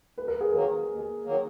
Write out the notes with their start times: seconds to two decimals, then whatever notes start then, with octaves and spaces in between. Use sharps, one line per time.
0.17 D#2 B4
0.28 A#4
0.41 G#4
0.52 D#3 F#3 A#3 A#4
0.88 D#2
1.24 D#3 F#3 A#3